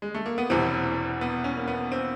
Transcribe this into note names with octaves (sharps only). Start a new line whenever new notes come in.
G#3
A3
A#3
B3
E1 E2 C3 E3 C4
B3
C#4
A#3
B3
C4